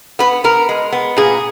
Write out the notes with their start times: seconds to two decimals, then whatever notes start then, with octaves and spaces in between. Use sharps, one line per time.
0.19 B3 B4
0.44 B3 A#4
0.69 G#3
0.92 B3
1.17 A#2 G#4